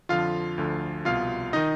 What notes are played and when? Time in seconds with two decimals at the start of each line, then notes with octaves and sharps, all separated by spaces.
0.09 F2 D3 F3 F4 F5
0.58 D2 D3 F3
1.05 C2 B2 F4 F5
1.53 D#3 D#4 D#5